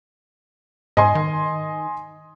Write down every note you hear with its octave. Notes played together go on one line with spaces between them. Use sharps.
G#2 D#5 G#5 C6
D#3